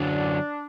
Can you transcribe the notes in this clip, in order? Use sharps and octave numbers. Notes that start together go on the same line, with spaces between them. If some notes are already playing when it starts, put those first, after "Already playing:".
Already playing: F#2 D3 F#3 D4